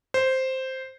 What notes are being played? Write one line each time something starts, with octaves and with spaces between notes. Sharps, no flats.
C5